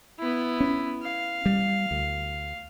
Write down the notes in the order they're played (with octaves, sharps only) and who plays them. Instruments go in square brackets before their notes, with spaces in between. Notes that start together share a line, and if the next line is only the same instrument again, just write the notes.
[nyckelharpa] B3 E4
[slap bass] C#4
[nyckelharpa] F5
[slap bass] G3
D2